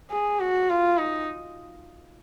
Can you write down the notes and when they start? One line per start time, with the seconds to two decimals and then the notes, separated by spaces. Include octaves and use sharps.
0.10 G#4
0.40 F#4
0.70 F4
0.99 D#4